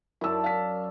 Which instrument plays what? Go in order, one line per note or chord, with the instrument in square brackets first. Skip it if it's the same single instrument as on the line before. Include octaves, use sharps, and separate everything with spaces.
[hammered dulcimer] F#2 D5 A5 [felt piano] E4 E6
[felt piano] F5 B6